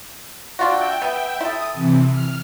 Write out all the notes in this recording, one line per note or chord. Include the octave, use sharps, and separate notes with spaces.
D4 F4 F#4 E5 G5
B3
E4 A4 D#6
C3 E3
F6